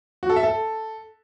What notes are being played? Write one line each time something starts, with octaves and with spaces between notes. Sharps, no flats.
F#4
A4
E5
A4